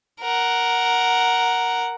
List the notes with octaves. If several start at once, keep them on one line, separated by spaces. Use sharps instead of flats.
A#4 F#5